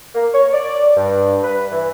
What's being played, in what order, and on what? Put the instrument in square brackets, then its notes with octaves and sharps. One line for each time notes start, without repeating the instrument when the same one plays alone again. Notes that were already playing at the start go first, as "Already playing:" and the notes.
[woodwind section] A#3
C#5
D5
G2
B4
E3